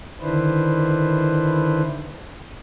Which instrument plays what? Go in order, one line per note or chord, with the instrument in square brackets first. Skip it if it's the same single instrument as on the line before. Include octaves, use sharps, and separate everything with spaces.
[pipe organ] D3 D#3 D4 E4 B4 C5